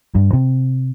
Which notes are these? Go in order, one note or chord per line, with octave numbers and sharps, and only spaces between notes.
G2
C3